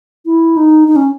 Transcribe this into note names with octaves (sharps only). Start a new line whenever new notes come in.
E4
D#4
D#4
C#4